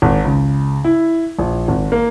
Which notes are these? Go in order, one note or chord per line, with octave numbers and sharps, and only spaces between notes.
G#1
C#2
E4
A#1
G#1
A#3